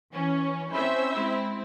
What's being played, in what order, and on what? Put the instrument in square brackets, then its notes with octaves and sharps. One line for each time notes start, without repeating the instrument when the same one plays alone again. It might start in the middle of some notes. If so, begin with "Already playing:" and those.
[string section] E3 C#4
[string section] C4 C#4 E4 [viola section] C5 E5
[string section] G#3 C4 E4